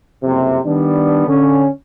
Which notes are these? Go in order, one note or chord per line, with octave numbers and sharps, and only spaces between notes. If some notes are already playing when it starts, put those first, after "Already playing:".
F#1 F2 C3
D#3 G3 B3 D4
D3 C#4